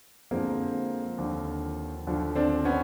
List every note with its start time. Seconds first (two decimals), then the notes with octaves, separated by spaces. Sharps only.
0.31 F2 D3 F3 G#3 A#3 C4
1.18 D#2 D3 F3
2.07 D#2 D3 F3
2.35 C4 D4
2.65 B3 C#4